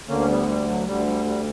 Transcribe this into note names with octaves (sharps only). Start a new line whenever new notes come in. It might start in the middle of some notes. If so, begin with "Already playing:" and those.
D2 D3 A#3 C#4
C#4
G3 B3
G3
F#3
D2 D3 G3
G3
G3